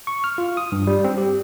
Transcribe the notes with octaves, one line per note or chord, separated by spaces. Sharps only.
C#6
F6
F4
D#6
G2
G3
C4
G4